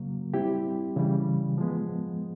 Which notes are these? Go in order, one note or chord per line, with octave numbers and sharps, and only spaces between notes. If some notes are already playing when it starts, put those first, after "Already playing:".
Already playing: C#3 F#3 A#3
G3 C4 E4 G4
C#3 E3 G3
F3 G#3 B3